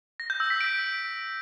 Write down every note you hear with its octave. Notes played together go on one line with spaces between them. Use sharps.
A#6
G6
E6
B6
D7